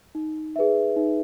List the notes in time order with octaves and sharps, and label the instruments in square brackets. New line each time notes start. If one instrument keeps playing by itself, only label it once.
[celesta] D#4
G#4 B4 E5
D#4